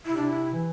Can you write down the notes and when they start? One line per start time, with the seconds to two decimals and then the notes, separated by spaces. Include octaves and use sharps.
0.05 C3 E4
0.17 D4
0.28 E4
0.53 E3